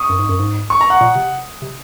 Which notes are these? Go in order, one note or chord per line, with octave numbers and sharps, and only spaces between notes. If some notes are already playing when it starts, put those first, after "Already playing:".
Already playing: C#6 D#6
F#2
G#2
F#2
G#2
C#6
A#5
F#5
A#2
C3
C3